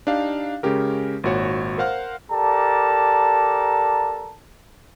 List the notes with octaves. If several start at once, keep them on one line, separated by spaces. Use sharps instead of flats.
D4 D#4 G4 F5
C#3 G#3 C#4 G4 A#4
G#1 A#2 F#4 C#5
A#4 C5 F5 F#5 F6
G4 A4 A#4 D5 A5 A#5